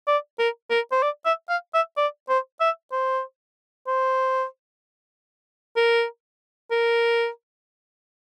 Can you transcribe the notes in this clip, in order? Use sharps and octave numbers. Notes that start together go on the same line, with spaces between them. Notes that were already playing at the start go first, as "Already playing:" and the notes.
D5
A#4
A#4
C5
D5
E5
F5
E5
D5
C5
E5
C5
C5
A#4
A#4